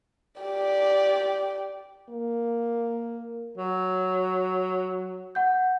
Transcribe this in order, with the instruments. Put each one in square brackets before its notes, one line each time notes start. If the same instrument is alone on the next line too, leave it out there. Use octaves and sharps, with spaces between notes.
[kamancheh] G4 D5
[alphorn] A#3
[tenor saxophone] F#3
[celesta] F#5 G6